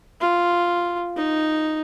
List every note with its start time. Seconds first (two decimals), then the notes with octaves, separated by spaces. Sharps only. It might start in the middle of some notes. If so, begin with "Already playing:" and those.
0.21 F4
1.17 D#4